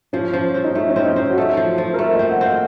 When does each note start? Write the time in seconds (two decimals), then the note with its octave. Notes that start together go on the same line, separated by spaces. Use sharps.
0.13 F3 C#4
0.33 F3
0.54 C4
0.64 D#4
0.74 A3 C#4
0.90 C#4
0.96 C4
1.06 D#4
1.16 C4
1.30 F#4
1.37 A3 A4
1.57 F3
1.78 F3
1.94 A#4
1.99 A3 C5
2.14 C4 D#5
2.31 F#5
2.41 C4 F5